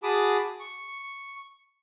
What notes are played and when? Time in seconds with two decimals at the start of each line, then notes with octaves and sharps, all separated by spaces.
0.03 F#4 G#4 A5 B5 D6 D#6
0.60 C#6